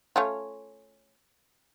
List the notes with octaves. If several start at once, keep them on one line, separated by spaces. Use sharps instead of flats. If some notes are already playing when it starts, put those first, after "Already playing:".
A3 C#4 F4